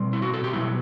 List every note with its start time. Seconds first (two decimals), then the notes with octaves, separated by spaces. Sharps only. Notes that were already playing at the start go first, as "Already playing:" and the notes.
Already playing: B2 G3 C4
0.13 E4
0.22 F#4
0.33 A4
0.44 G4
0.53 B2 F#3 B3 E4